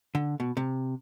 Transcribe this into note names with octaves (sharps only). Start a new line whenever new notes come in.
D3
B2
C3